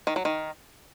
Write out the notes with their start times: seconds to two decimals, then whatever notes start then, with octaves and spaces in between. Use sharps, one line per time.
0.07 D#3
0.16 F#3
0.25 D#3